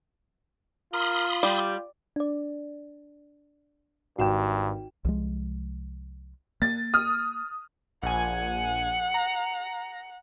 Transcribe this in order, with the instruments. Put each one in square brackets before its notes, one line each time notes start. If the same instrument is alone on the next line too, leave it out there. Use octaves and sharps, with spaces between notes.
[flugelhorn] F4 [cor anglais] A#4 [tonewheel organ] B5 C6 D#6
[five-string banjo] G3 [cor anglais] G4
[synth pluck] D4 D5
[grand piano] G#1 E7 [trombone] G2 [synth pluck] F#4 G5
[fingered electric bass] C2 F3 G#3
[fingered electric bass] A#3 [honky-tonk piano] A6
[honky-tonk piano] D#6 F6
[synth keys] A#1 G#5 [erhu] F#5
[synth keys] A#5